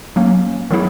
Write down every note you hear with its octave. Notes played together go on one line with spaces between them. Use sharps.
F#3 A#3 C#4
D#3 F#3 B3 E4 G#4